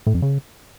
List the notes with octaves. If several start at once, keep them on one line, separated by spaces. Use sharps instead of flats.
A2
F2
C#3